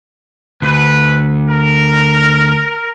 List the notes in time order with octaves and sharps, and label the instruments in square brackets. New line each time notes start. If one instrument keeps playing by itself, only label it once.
[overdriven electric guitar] D2 [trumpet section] B4
[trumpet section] A#4